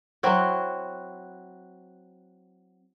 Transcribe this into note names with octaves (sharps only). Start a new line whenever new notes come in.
F#3 C4 E4 F#4